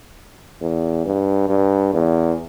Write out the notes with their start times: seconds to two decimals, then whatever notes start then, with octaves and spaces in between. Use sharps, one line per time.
0.62 E2
1.05 G2
1.49 G2
1.94 E2